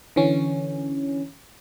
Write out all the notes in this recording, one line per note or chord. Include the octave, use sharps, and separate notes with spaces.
D3 E3 C#4